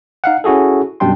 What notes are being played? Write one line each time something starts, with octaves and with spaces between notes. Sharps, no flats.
D#4 F5 F#5
C#4 E4 F#4 G#4 A4
F#2 B2 G3 D4 G5 C6